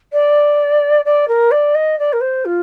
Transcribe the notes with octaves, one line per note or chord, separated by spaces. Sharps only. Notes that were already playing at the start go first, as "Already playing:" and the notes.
D5
D5
A#4
D5
D#5
D5
A#4
C5
F4